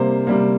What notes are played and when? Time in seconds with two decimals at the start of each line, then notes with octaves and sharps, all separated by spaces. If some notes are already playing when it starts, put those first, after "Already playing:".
Already playing: C3 G3 A#3 C5
0.27 C3 G3 A#3